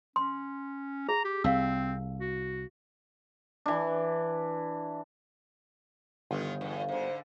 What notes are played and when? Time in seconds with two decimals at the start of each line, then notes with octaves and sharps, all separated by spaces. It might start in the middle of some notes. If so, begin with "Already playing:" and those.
0.16 C#4 C6
1.09 G#4 A#5
1.25 G4
1.44 C2 C4 F5 E6
2.21 F#4
3.66 E3 D4
6.31 G1 D#3 E3 F4
6.61 E2 G2
6.89 G#2 D3 C5